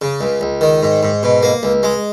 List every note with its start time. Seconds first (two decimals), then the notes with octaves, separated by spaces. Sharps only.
0.02 C#3
0.21 C#2
0.41 C#2
0.61 D#3
0.83 G#2
1.03 G#2
1.23 B2
1.43 A#3
1.63 C#2
1.83 G#3